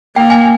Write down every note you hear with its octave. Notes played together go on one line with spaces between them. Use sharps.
A#3 G5
G#5